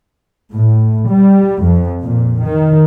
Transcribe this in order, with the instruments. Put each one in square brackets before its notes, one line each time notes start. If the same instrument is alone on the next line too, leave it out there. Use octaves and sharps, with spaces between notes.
[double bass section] A2
G3
F2
A#2
D#3